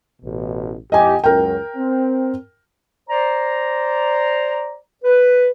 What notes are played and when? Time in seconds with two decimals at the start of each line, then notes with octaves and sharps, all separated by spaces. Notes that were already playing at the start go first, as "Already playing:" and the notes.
0.23 A1 B2
0.92 F2 G4 D#5 G#5
1.24 C#2 F#2 A#4 G5
1.76 C4
3.09 C5 D5 A#5
5.04 B4